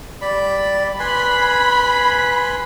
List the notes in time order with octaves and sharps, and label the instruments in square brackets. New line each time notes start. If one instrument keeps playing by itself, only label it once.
[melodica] G3 D5 B5
[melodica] B4 G#5 C6 [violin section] B5 B6